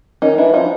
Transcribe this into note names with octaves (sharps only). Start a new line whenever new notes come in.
D#3 C#4 D#4
E3 D4 E4
F3 C#4 D#4